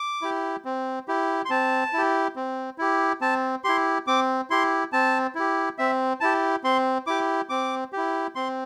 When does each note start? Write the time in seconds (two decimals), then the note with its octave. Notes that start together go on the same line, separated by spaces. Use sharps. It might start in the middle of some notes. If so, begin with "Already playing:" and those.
Already playing: D6
0.22 E4 G4
0.65 C4
1.08 E4 G4
1.45 C6
1.50 C4 A5
1.93 E4 G4
2.36 C4
2.78 E4 G4
3.21 C4 A5
3.64 E4 G4 C6
4.07 C4 D6
4.50 E4 G4 C6
4.93 C4 A5
5.35 E4 G4
5.78 C4 E5
6.21 E4 G4 A5
6.64 C4 C6
7.07 E4 G4 D6
7.49 C4 D6
7.93 E4 G4
8.35 C4 C6